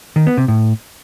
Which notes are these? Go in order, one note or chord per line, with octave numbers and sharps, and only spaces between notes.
D#3
B3
C3
A2